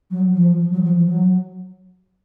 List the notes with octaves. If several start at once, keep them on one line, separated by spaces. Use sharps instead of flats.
F#3
F3
F3
F#3
F3
F3
F#3